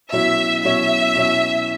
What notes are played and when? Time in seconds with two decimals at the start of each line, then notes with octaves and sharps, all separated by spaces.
0.12 B2 F#3 C#4 E4 E5
0.64 B2 F#3 C#4 E4 E5
1.15 B2 F#3 C#4 E4